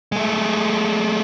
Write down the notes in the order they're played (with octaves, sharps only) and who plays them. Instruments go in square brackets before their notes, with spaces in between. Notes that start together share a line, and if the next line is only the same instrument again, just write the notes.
[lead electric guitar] G#3 A3